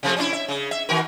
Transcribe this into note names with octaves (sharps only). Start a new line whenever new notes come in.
C3 F3 A3
C#4 D4 E4
E5
C#3
E5
D#3 F#4 A#4